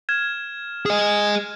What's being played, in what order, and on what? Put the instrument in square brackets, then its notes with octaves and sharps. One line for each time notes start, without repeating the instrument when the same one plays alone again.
[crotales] F6 G#6 E7
[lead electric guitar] G#4 D#5